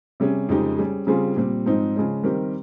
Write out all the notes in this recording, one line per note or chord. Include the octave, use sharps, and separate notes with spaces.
C3 G3 C#4 G#4
F2 C#3 G#3 D#4 G4
G3 C#4 G#4
C#3 G3 C4 F4 G#4
A#2 G3 C4
G#2 F3 C4 D#4
C#3 F3 G#3 C#4
D#3 G3 C4 G4 A#4